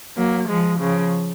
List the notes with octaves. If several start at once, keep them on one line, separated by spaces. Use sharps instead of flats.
F#3 A#3
F3 G#3
C#3 F3